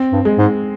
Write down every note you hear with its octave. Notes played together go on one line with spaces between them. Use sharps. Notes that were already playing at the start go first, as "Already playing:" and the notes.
Already playing: C4
G2
G#3
G#2